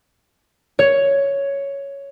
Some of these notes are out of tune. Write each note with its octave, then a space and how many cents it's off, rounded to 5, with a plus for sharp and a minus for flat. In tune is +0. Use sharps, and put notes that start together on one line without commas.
C#5 +5